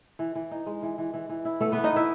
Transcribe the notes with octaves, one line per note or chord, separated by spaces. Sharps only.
E3
E3
D#4
G#3
E3
E3
E3
E3
E4
A3 B3 A4
E3 B3 B4
D#4 D#5
E3 E4 E5